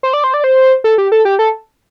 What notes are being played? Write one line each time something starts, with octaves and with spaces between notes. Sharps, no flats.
C5
D5
C5
D5
C5
A4
G4
A4
G4
A4